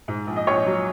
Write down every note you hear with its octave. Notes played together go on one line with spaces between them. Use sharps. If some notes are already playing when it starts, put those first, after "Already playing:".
G#2
A#1
D#5
A#1 C#5
F#3